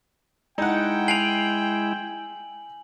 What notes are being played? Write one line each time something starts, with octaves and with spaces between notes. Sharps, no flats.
G#3 D#4 E4 F#5 G5
G#5 C7 D7 F7 F#7